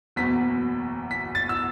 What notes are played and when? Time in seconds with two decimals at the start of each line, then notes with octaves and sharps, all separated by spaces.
0.16 F#1 E2 B2 F#3 B6
1.11 B6
1.35 A6
1.49 E6